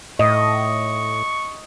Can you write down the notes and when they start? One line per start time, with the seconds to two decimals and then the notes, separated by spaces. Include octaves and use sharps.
0.19 A2 D#5 C#6